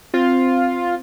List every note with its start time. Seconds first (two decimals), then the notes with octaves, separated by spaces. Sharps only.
0.14 C4 F4